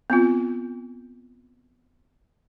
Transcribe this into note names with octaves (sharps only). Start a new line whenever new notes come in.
B3 C4 F4